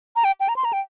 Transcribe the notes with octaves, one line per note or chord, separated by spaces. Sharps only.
A#5
G5
G5
A#5
C6
A#5
G5